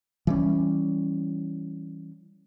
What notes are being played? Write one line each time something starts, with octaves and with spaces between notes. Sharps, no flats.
E3 G3 C#4